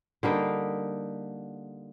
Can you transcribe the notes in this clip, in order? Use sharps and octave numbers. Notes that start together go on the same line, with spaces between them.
D3 G3 A#3 D#4